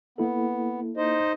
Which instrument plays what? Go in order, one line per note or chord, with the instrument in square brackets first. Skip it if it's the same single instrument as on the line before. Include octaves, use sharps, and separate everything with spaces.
[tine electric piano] A#3 E4 A4 [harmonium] B3
[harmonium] D#4 C5 D#5